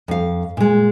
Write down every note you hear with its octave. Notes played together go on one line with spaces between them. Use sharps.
F2 F5
A#2 G#3